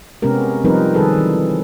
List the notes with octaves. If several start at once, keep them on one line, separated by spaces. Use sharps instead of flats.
C3 G#3 B3 C#4 G4 A#4
F3 G3 C4 D#4 A#4 B4
D#3 G3 G#4 A4 B4
E3